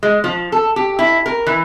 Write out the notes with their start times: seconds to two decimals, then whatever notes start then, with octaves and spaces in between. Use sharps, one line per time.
0.03 G#3
0.24 F3
0.52 A4
0.76 G4
0.99 E4
1.26 A#4
1.47 E3